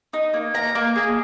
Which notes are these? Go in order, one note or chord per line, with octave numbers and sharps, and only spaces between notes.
D#4
A#3
A#3 A#5
A#3
G#4